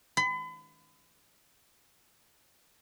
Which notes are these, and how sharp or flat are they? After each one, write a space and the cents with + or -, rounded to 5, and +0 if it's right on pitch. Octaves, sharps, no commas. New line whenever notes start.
B5 +40